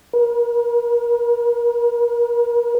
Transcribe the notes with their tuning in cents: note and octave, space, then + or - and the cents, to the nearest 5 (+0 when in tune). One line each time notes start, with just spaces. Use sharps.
A#4 +40